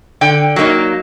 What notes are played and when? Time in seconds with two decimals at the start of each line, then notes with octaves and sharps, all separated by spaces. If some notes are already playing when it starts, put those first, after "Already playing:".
0.21 D3 G5
0.56 F#3 A#3 D#4